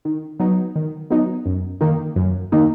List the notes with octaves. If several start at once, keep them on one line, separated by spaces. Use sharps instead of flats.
D#3
F#3 B3 D#4
D#3
F#3 B3 D#4
F#2
D#3 A#3 D#4
F#2
D#3 A#3 D#4